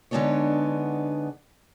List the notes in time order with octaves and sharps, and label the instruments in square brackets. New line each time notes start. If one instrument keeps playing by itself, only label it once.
[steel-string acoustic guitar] D3 G#3 B3 D4 D#4 C#5